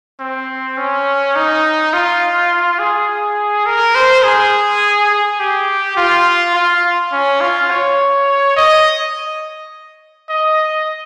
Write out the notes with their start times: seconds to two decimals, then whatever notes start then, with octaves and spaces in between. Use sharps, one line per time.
0.20 C4
0.77 C#4
1.35 D#4
1.93 F4
2.79 G#4
3.66 A#4
3.95 C5
4.23 G#4
5.10 G#4
5.40 G4
5.97 F4
6.55 F4
7.13 C#4
7.41 F4
7.71 C#5
8.56 D#5
10.30 D#5